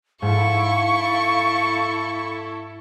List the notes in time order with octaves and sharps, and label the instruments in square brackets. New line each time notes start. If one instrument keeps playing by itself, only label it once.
[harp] G#2 [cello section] E4 A4 [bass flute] F5 [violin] C#6